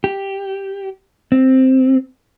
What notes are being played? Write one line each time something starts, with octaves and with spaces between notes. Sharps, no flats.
G4
C4